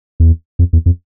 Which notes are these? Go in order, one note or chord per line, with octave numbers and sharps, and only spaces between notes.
E2
F2
E2
F2